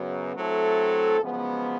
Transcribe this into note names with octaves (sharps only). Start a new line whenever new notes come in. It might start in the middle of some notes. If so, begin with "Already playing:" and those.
Already playing: F#2 C#3 F#3 B3
F#3 A3 C4 E4 A4
F#2 C#3 F3 G#3 B3